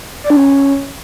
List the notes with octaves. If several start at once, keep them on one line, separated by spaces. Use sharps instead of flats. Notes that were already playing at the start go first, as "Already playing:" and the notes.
D5
D4
C#4